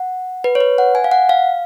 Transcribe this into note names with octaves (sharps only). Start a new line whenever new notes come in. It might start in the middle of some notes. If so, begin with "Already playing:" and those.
Already playing: F#5
B4
C#5
B4
F#5
G#5
F5
F#5
F5